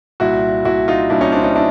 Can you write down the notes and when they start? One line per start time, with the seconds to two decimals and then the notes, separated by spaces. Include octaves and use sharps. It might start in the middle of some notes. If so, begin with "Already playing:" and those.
0.20 C2 A#2 E4 F#4
0.65 C2 A#2 E4 F#4
0.88 D#4 F4
1.10 C2 A#2 D4 E4
1.21 C#4 D#4
1.32 C4 D4
1.43 C#4 D#4
1.55 D4 E4